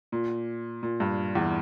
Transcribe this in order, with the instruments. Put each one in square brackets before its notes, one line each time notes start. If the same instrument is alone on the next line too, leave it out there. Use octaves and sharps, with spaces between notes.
[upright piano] A#2
A#2
G2
E2